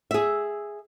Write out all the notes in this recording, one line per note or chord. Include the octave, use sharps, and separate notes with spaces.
G#4 E5